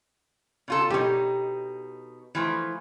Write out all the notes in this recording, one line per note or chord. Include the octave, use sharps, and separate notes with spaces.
C#3 F4 A4
B2 D#4 G4 C#5
E3 F3 A3